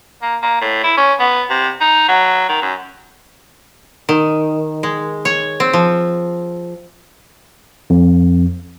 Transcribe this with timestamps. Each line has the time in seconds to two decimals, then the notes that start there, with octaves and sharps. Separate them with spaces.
0.22 A#3
0.42 A#3
0.61 A2
0.83 E4
0.97 C#4
1.19 B3
1.50 C3
1.81 D#4
2.08 F#3
2.49 D#3
2.62 F#2
4.09 D#3
4.83 G#3
5.25 C#5
5.60 C4
5.73 F3
7.90 F2